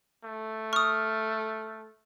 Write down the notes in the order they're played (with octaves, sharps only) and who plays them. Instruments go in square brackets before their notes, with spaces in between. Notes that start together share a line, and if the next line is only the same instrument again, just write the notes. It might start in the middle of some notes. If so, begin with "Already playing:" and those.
[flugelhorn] A3
[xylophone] C#6 D#6 [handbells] F6